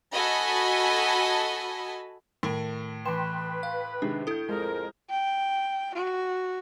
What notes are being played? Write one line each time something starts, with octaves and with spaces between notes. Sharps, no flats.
F#4 A4 D#5 G#5 A5 B5
A2 D#3 A#4
E3 B4 G5 C6 E7
F5
C3 D#3 G#3 D4
E4 A4 D#6 G6
F2 G#3 A#4
G5
F#4